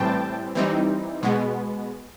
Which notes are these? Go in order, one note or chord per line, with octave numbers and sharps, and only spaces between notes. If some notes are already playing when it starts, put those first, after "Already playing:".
Already playing: A2 E3 G3 C4 G5 A5
E3 G3 C4 D#4
B2 G#3 B3